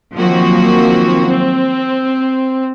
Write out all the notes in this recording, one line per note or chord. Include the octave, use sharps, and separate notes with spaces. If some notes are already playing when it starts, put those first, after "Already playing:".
D#3 F3 F#3 A#3 C4 F#4
C4